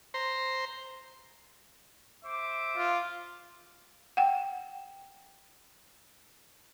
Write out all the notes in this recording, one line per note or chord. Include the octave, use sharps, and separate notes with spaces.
C5 A#5 C6
C5 E5 D6
F4
F#5 G5